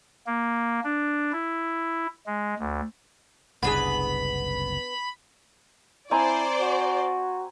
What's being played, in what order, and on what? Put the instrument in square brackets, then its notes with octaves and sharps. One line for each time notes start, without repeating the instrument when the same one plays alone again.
[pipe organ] A#3
D4
E4
G#3
D2
[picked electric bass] F#1 C2 [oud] B3 D4 G#4 [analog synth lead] B5
[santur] C4 G#5 A#5 [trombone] E4 [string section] C5 D5
[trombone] F#4